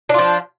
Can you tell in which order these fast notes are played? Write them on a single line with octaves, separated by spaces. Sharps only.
D4 F4 F3